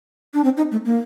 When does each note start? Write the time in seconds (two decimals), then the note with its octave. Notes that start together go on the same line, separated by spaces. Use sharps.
0.34 D4
0.44 C4
0.57 D#4
0.72 A3
0.85 A#3